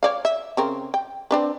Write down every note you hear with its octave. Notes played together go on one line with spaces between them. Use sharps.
C#5 D5 F5
E5
C#3 C4 A#4
G5
C4 D4 B4